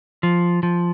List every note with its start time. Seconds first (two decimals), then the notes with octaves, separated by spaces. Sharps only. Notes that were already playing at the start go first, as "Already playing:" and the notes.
0.23 F3
0.63 F3